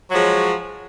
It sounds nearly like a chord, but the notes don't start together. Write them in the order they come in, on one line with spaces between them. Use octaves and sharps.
F#3 F3 G#3